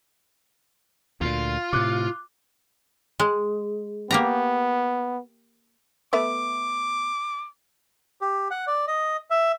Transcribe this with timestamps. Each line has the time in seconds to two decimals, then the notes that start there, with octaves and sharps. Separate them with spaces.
1.21 D2 A#2 F4
1.73 A2 C3 D6 F#6
3.20 G#3
4.11 A#3 B3 G4 A#5
6.13 A3 B3 E5 D6
8.21 G4
8.51 F#5
8.67 D5
8.87 D#5
9.30 E5